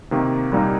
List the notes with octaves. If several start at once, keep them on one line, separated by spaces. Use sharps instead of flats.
C3 D#3 A#3
C2 A#2 G3 A#3 D#4